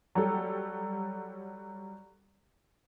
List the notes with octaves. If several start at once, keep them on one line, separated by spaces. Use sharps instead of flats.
F#3 G3 A4